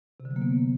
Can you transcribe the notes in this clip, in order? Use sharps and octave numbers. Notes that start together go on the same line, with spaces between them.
C3
D3
F#3
A#3
B3